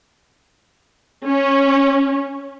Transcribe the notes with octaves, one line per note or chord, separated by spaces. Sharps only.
C#4